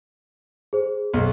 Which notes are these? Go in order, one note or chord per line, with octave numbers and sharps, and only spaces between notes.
G#4 C5
B1